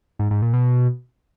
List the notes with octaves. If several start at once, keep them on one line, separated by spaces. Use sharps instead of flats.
G#2
G#2
A#2
B2